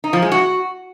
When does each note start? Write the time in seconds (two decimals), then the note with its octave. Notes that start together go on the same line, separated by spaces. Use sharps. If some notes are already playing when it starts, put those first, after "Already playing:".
0.04 D#4
0.13 F3
0.22 G#3
0.32 F#4